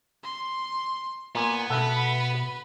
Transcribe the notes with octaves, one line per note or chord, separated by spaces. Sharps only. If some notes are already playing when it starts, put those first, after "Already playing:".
C6
A#2 B3 G#5
B2 A3 A4 B4 F#5 B5